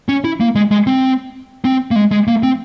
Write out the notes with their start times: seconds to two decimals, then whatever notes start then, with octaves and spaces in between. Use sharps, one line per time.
0.09 C#4
0.24 E4
0.40 A#3
0.55 G#3
0.71 G#3
0.87 C4
1.65 C4
1.91 A#3
1.96 G#3
2.12 G#3
2.28 A#3
2.43 C4